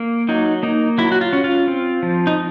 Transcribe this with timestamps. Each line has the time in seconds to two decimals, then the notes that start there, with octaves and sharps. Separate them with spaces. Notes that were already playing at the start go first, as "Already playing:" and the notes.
Already playing: A#3
0.29 F#3 D#4
0.63 A#3 D#4
0.98 F#3 E4
1.12 F#4
1.21 F4
1.33 C#4
1.44 F4
1.68 C4
2.03 F3
2.27 D#4